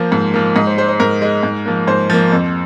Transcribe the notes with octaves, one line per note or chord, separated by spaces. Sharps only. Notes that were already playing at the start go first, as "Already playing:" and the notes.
Already playing: F3 A#3 C5
G#2
F3 A#3
G#2 D#5
C5
G#3 C5
C5
G#2 A#4
G#3
G#2
F3 A#3
G#2 C5
F3 A#3
F2